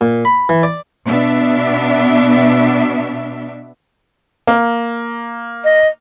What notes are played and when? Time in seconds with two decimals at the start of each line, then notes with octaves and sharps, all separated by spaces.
0.01 A#2
0.25 B5
0.49 E3
0.63 D5
1.04 B2 B3 D4 E5
4.47 A#3
5.64 D#5